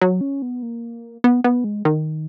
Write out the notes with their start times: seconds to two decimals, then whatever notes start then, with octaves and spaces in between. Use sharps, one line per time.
0.02 F#3
0.21 C#4
0.42 B3
0.62 A#3
1.24 B3
1.44 B3
1.64 G#3
1.85 D#3